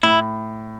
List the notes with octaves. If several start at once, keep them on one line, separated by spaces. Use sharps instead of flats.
A2 E4